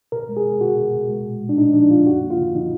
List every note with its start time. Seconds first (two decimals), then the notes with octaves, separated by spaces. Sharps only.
0.12 B2 A#4
0.29 G#3
0.37 G#4
0.45 B2
0.61 B2 F#4
0.77 B2
0.93 B2
1.09 G#3
1.25 A#2
1.42 G#3
1.49 D4
1.57 A#2 D#4
1.74 F3 D4
1.90 F3 F4
2.06 F#2 F#4
2.23 A#3
2.31 F4
2.38 D3
2.55 F3 D#4